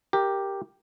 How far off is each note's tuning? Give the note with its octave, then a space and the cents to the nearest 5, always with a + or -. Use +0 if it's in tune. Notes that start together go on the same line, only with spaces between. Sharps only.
G4 +0 A#4 +0